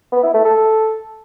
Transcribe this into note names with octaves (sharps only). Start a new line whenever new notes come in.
B3
E4
A3
A4